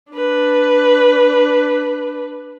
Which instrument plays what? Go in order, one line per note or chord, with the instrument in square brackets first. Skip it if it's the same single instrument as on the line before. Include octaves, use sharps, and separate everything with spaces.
[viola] D4 B4